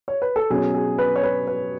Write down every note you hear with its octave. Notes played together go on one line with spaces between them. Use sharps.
C#5
B4
A4
B2 F#3 C#4 G#4
G#4
B4
C#5
B4
B4